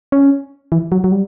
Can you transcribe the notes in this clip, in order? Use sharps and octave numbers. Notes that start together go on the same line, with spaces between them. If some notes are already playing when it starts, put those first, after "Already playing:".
C#4
E3
F#3
F#3
G3